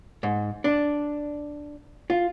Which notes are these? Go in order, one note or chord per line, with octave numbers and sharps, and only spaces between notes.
G#2
D4
F4